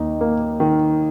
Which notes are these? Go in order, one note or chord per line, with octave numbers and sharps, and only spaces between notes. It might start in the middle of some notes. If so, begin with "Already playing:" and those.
Already playing: D#2 D#4
A#3
D#3